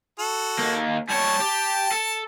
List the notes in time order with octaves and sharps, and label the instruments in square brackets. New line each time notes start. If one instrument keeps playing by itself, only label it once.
[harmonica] F#4 A4
[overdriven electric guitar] D#2 A#3
[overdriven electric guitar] G3 C#5 [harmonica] A5
[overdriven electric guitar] G4
A4